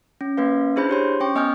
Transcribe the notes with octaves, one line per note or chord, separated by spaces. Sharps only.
C#4
A#3 C#4 B4 F5
D4 E4 G#4 C5 B5 G6
G4 C#5 C6
C#4 G5 C#6
B3 D#5 G#5 D#6 F6 G6